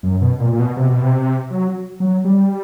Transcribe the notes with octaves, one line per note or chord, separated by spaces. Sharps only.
F#2
B2
A#2
A#2
B2
C3
B2
C3
F#3
F#3
G3